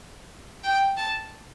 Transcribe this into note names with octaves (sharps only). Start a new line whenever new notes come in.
G5
A5